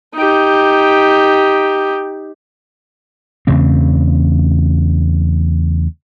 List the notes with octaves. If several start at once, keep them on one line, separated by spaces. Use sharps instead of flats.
D#4 G4
E2 C#3 A3 C4